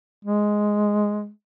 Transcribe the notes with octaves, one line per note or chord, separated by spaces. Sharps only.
G#3